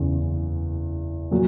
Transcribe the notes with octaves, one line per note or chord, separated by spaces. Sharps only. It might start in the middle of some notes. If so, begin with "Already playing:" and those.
Already playing: F#1 E2 C#3 E3
A#2 F#3